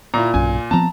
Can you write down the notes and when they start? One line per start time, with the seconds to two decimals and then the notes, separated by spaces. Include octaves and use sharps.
0.14 A#2 E4 A#5
0.34 B1 G2 C#4 G#5
0.71 F3 B3 C4 A5 A#5